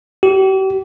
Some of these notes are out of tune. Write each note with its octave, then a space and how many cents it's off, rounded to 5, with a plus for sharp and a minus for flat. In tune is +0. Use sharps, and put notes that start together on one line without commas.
G4 -40